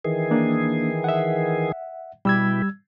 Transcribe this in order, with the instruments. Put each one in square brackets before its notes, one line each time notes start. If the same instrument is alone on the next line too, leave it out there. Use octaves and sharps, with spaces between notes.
[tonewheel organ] D#3 E3 G#4
[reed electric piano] A#3 D4
E5 F#5
[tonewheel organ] B2 E4 G4 [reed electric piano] G3 E6 G#6